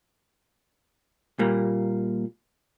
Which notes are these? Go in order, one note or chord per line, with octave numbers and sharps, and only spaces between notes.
A#2 G3 A#3